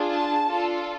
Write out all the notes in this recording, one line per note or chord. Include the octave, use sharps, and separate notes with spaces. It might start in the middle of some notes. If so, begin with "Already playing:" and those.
Already playing: D4 F4 G#4
A5
D4 F4 A4